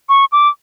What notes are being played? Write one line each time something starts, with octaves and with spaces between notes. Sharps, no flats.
C#6
D6